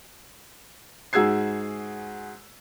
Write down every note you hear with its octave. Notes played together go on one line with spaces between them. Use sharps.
G#2 F#4 G#4 E6 G#6 C7